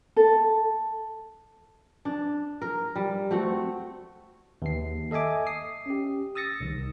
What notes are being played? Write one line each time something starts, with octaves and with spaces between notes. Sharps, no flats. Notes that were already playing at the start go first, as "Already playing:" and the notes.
A4
D4
A#4
G3
A3 C4 F#4
D#2 C7
A4 D#5 E5 G#5 D6
D#6 C7
C#4 G4
D#6 E6 A6 A#6 C#7
C2 D#3